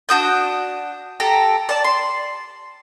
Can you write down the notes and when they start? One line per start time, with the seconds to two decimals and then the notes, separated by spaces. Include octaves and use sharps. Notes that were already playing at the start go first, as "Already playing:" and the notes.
0.09 D4 F#4 D#6 G6
1.20 G4 A4 A#5
1.69 D5 A5
1.84 C6